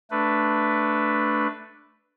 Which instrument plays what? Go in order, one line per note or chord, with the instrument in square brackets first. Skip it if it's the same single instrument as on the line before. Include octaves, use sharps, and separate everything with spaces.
[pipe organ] A3 D4 B4